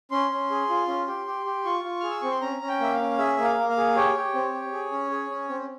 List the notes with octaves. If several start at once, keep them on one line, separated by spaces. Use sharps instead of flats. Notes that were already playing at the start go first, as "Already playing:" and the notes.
C#4 C6
C#4
G#4
F4
C#4
G4
G4
G4
F4 C#6
F4
G#4 F6
E6
C4 C#6
C6
C#4 A#5
C#4
G5
A#3 E5
F5
C#4
G#4 E5
A#3
F5
A#3
F5
G#4
G4 C#5
G4
C4
G4
G#4
C#4
G#4
C#4
C4